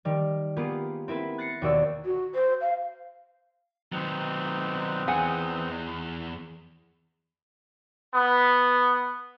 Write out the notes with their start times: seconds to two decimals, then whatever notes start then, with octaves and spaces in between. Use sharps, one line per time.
0.05 D#3 G3
0.56 A#3 B3 F4 G4 G#4
1.08 C4 E4 A#4 B4
1.38 F#6 A6 A#6 C7 C#7
1.62 D#2 B2 F#4 C#5 D5 E6
2.05 F#4
2.35 C5
2.61 F5
3.92 D#3 F#3 C4 D#4 B4
5.08 E2 E3 G#4 F#5 G#5
8.14 B3